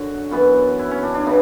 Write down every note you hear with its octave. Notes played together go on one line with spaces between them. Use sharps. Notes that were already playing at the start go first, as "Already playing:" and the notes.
Already playing: F#2 D3 F#4
F#2 E3 B3
E4
C#4
D4
D4
C#3 E3 B3 D4